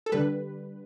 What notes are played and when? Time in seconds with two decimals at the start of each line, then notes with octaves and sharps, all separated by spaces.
0.06 A4
0.12 D3 G3 B4